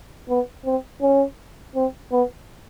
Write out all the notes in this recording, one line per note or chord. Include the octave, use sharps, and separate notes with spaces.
B3
C4
C#4
C4
B3